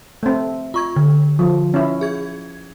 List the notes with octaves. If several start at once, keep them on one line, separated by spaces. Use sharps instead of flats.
A3 C4
F4 C#6 G#6
D3
F3
C#4 E4
G#4 G#6